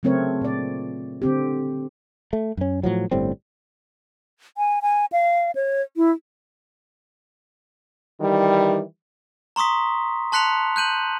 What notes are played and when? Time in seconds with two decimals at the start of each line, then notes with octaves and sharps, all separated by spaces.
0.03 C#3 F#3 A3 C4 A#4 C#5
0.41 A#2 D5
1.22 D3 C4 G4
2.33 A3
2.57 F#2 C#4
2.83 A2 F3 F#3
3.11 G1 A2 G3 C4
4.58 G#5
4.82 G#5
5.12 F5
5.55 C#5
5.97 E4
8.20 D#3 E3 G3
9.56 A#5 C6 C#6 D#6 B6
10.32 A5 C6 F#6 B6 C#7 F7
10.76 F#6 G6 D#7 F#7